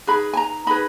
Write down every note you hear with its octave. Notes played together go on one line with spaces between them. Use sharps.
D#4 G#4 B4 B5
G#5
A#5
D#4 G#4 B4 B5